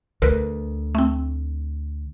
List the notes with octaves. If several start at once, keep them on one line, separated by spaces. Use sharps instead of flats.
D2 A#4 B4
A3 C4